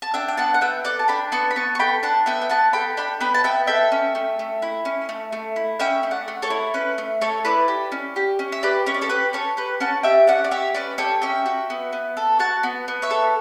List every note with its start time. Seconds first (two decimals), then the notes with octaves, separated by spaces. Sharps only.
0.02 A5
0.14 D4 E5 G5
0.28 G5
0.37 B3 F#5 A5
0.54 F#5
0.61 B3 E5 G5
0.85 A4 D5 F#5
0.99 A5
1.08 D4 G5 B5
1.32 B3 A5 C#6
1.51 B5
1.56 B3 A5 C#6
1.75 C#6
1.79 A4 G5 B5
2.03 D4 F#5 A5
2.26 B3 E5 G5
2.41 G5
2.49 B3 F#5 A5
2.73 A4 G5 B5
2.97 D4 G5 B5
3.21 B3 G5 B5
3.34 A5
3.44 B3 E5 G5
3.67 A4 E5 G5
3.92 C#4
4.15 A3
4.39 A3
4.62 E4
4.85 C#4
5.09 A3
5.32 A3
5.56 E4
5.79 C#4 E5 G5
6.03 A3
6.11 D5 F#5
6.28 A3
6.42 A4 C#5
6.50 E4
6.74 C#4 B4
6.98 A3
7.21 A3 A4 C#5
7.45 E4 B4 D5
7.68 G4
7.92 C#4
8.16 G4
8.39 C#4
8.52 E5
8.63 G4 B4 D5
8.86 C#4 C#5
8.94 D5
9.01 A4 C#5
9.09 G4 B4
9.33 C#4 A4 C#5
9.57 G4 B4
9.80 C#4 F#5 A5
10.03 G4 E5 G5
10.27 C#4 D5 F#5
10.44 D5
10.51 G4 C#5 E5
10.75 C#4 B4 D5
10.98 G4 A4 C#5
11.22 C#4 E5 G5
11.46 F#4
11.70 B3
11.93 B3
12.17 A4
12.39 F#4 F#5 A5
12.63 B3
12.88 B3
13.02 C#5 E5
13.11 A4